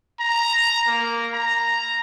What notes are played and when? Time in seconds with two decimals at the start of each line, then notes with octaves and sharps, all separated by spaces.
0.20 A#5
0.87 A#3
1.34 A#5